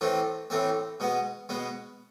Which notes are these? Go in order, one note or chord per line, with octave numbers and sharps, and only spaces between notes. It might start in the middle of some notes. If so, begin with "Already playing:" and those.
A2 E3 A3 C4
A2 E3 A3 C4
B2 G#3 B3
B2 G#3 B3